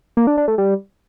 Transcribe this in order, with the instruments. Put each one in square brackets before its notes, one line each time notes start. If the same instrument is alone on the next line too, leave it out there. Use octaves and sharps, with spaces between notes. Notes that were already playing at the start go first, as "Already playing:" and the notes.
[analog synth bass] A#3
D4
D4
A3
G3